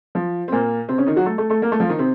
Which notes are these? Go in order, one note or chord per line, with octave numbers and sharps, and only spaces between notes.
F3
C4
A#2 A#3
C3 C4
C#3 C#4
D#3 D#4
F#3 F#4
A3 A4
A3 A4
A3 A4
A#3 A#4
A3 A4
F3 F4
D#3 D#4
C3 C4